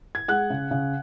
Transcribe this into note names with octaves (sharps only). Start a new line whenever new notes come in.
G#6
G#3 F#5 F#6
C#3
C#3